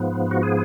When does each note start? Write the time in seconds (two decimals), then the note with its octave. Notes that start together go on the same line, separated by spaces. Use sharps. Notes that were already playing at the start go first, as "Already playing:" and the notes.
Already playing: G#2 F3 B3
0.31 F#4
0.43 G#4